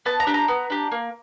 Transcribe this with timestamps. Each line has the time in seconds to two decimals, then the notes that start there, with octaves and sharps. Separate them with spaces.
0.06 B3 A5
0.20 A#5
0.27 D4 G4
0.34 A#5
0.48 B3
0.70 D4 G4
0.91 A#3